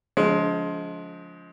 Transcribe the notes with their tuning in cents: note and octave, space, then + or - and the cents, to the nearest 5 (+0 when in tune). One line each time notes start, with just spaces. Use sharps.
D3 -45 F3 +10 G#3 +20